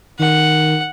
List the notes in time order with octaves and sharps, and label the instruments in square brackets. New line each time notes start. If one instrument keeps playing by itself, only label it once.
[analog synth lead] D#3 [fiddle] F#5